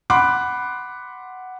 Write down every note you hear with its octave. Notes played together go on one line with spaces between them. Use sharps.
F#5 B5 C6 D6 F#6